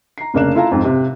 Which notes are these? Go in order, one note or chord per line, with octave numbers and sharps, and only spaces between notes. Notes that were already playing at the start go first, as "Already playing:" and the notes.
A#5 C7
F1 C#3 A#3 D4 F#6 E7
E4 F4 A4 F5 A5 A#5
F2 G#2
C3